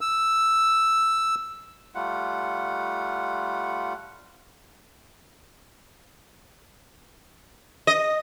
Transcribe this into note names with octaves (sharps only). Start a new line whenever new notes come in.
E6
G3 A3 F4 F#5
D#5